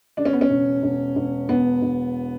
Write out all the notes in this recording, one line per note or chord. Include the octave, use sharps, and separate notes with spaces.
C#3 D4
C#4
B3
C#4
E1
E1
E1
E1 B3
E1